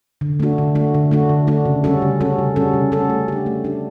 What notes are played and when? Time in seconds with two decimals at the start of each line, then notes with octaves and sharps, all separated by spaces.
0.21 D3
0.40 A3 D4 F#4
0.58 D3
0.75 A3 D4 F#4
0.94 D3
1.11 A3 D4 F#4
1.29 D3
1.47 A3 D4 F#4
1.65 C#3
1.84 G3 C#4 F#4 A4
2.02 C#3
2.20 G3 C#4 F#4 A4
2.39 C#3
2.56 G3 C#4 F#4 A4
2.74 C#3
2.92 G3 C#4 F#4 A4
3.10 A3
3.28 D4 G4
3.46 A3
3.64 D4 G4